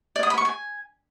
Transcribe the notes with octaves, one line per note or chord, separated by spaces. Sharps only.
D5
D#6
B5
C#6
G#5